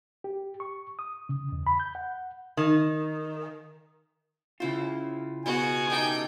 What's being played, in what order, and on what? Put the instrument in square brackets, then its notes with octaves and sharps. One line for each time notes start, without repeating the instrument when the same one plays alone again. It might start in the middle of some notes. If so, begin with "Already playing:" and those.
[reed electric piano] G4
C#6
D#6
C#3
E2
B5
G6
F#5
[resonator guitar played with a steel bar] D#3
[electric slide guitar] C#3 F4 [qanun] E4 C5
[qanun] B2 G#4 C6 [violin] F#4 [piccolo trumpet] G#5
[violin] D#4 G5 [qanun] G4 A4 E5